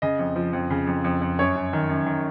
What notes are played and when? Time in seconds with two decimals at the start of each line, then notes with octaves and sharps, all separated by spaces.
0.02 C#3 D#5
0.19 F2
0.36 F3
0.53 F2
0.70 C#3
0.87 F2
1.04 F2
1.22 F2
1.39 F#2 C#5
1.55 F#2
1.73 D#3
1.89 F#2
2.06 D#3